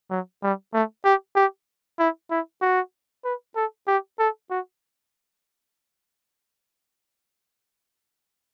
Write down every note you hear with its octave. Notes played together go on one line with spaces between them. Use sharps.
F#3
G3
A3
G4
G4
E4
E4
F#4
B4
A4
G4
A4
F#4